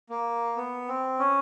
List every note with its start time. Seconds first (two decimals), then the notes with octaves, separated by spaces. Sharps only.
0.10 A#3
0.57 B3
0.88 C4
1.19 C#4